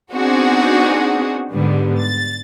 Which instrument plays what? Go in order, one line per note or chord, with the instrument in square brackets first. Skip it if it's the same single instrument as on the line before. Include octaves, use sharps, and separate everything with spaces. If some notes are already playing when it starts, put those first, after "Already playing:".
[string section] B3 C4 D4 D#4 F#4 G#4
G#2 D3 G3 B3
A6